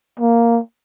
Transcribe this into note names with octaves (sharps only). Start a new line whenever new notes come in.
A#3